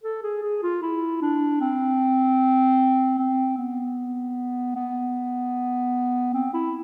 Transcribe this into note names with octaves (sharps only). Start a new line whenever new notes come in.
A4
G#4
G#4
F4
E4
D4
C4
C4
B3
B3
C4
E4